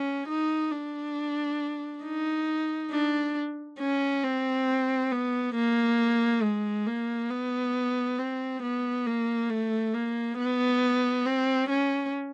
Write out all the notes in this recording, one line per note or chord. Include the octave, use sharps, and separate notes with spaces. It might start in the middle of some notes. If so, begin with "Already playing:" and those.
Already playing: C#4
D#4
D4
D#4
D4
C#4
C4
B3
A#3
G#3
A#3
B3
C4
B3
A#3
A3
A#3
B3
C4
C#4